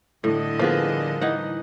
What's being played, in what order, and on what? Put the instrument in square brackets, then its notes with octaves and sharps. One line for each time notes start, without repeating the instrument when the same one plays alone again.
[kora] A2 [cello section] D3 G3 D#5
[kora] F3 [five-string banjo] A#3 B3 G#4
[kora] E3 D#4 F#5